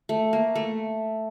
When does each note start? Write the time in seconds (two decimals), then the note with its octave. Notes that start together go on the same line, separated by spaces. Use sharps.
0.09 A3
0.33 A#3
0.55 A3